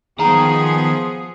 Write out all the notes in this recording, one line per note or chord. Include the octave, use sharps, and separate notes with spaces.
D#3 F3 B3 G#4 A#5